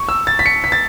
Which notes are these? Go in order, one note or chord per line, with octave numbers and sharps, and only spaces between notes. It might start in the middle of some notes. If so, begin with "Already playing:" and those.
Already playing: C#6
E6
A6
B6
C#7
B6
A6